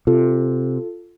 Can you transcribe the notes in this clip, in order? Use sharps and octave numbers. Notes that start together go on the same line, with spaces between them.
C3 F4 A4